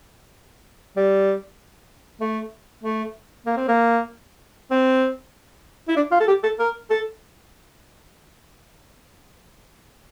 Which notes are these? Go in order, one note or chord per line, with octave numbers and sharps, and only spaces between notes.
G3
A3
A3
A#3
C4
A#3
C4
E4
D4
F4
A4
G4
A4
A#4
A4